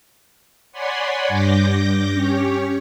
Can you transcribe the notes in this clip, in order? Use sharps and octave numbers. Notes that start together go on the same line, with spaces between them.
C#5 D5 F#5 G#5 B5 C6
G2 D6 G6 A#6
C#4 G4 C#5